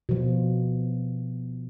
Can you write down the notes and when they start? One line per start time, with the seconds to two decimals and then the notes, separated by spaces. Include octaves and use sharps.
0.09 B2 F3